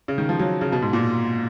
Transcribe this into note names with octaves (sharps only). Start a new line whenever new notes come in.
C#3
D#3
F3
F#3
C#3
B2
G#2
A#2